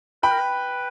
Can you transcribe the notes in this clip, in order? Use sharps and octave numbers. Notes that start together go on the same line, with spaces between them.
B4 G5 B5
A#4
B4